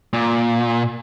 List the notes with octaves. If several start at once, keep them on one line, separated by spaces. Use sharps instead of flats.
A#2